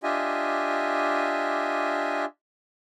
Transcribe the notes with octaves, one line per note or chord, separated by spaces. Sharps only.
D4 F4 G4 D#5 E5 G#5